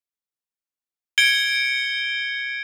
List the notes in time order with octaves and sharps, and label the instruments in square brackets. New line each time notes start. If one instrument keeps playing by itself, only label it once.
[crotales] G#6 C#7 D7 G7